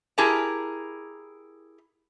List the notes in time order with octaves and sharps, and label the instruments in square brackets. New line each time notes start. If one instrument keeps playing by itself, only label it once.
[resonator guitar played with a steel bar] E4 G4 G#4 A#4 A5 A#5